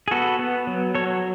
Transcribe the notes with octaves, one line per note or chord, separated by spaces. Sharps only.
G#4
B3 F#4 A4
B3
F#3
F#3 A4 C#5